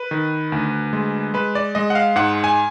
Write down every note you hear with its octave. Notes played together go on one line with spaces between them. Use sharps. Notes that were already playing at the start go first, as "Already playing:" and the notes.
Already playing: B4
D#3
D2
G#3
G#3 B4
D5
G#3 D#5
F#5
F5
G#2 F#5
G#5